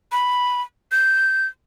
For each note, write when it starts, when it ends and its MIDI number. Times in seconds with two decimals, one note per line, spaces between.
0.12 0.62 83
0.92 1.46 91